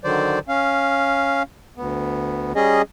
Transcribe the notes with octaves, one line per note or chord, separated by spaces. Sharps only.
D3 D#3 F#3 C5 D5
C#4 F5
D2 B3
G3 C#4 G#4 D#5